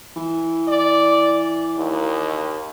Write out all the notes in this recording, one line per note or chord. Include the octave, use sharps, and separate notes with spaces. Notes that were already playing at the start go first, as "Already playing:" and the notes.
E3
D5
D#2